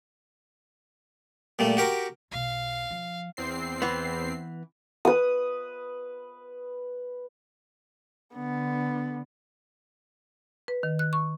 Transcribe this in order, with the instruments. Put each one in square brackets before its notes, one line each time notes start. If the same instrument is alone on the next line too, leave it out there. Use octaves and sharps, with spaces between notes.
[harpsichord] A#2 G3 A3
F#4 G4 A#4
[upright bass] B1 B2 [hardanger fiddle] F5
[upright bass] F3
[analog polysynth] E2 C4 C7
[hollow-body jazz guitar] E3 B3
[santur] B4 D#6
[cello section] D3 [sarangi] B3
[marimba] B4
D#3
F#6
C#6